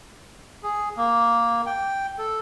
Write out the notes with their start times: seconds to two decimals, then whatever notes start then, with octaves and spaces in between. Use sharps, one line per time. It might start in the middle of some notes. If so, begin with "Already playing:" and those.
0.63 G#4
0.97 A#3
1.66 G5
2.18 A4